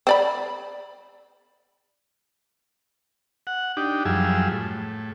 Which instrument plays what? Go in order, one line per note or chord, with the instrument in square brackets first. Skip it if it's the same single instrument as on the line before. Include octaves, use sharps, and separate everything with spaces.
[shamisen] C4 D5 B5
[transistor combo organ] F#5
D4 D#4 G4
F#2 F3 G3 G#4 E6
A2